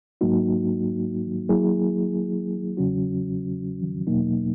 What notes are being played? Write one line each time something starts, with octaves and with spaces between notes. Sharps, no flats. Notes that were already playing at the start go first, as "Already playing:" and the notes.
G#2 F#3 A#3 D#4 F#4
F#3 A#3 E4 G#4
E2 C#3 F#3 C#4 F#4
E2 B2 F#3 A#3 D#4